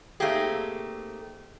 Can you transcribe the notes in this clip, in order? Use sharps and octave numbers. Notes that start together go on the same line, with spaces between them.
A3 A#3 C4 D#4 G4 G#4